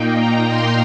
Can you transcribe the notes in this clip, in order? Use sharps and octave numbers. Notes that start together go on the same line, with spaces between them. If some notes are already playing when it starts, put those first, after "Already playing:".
Already playing: A#2 A#3 D#4 G5
A#5
C6